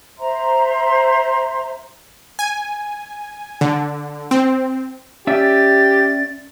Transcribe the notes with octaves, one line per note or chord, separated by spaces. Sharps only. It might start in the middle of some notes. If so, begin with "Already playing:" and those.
C5 E5 A#5 C6
G#5
D3
C4
C#4 G4 D5 E5 A6